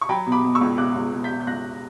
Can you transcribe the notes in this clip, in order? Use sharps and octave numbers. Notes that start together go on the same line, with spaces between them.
C#6
F#3 G5 B5
B2
B5 D6
B2
C#6 E6
C#2
B2 D6 F#6
C#2
B2
G6 B6
B2
G6
C#2 F#6 A#6